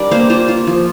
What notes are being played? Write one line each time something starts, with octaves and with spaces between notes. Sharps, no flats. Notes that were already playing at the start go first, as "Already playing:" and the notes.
Already playing: G3 D4 A#4 D5
A#3 C5 F5
F4 C5 F5
F4
F3